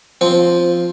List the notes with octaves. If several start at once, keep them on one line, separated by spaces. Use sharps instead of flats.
F3 C4